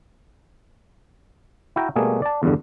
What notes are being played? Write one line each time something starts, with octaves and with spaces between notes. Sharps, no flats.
E4 F#4 G5 A#5
B2 G3 A3 A#3 G#4
D5 A5
E2 G2 D3